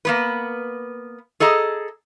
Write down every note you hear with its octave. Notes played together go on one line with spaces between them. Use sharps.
A#3 B3 B4
G#4 A4 D#5 A#5